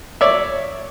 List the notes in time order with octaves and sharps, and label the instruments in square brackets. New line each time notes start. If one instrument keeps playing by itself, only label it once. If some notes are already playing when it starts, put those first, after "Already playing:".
[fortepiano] C#5 D5 E5